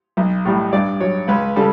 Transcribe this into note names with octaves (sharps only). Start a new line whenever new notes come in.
B1
A2 G3
G2 D5
F#3 C#5
C#2 B4
C#3 G3 A4